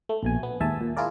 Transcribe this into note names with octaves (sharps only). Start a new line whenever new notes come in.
A3
A#1 B2 G#5
B3
D#2 G#2 E5 G#5 A5
A#2
E4 F4 G#4 A#4 D5